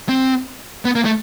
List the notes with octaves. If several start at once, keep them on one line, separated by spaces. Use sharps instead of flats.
C4
B3
A#3
A3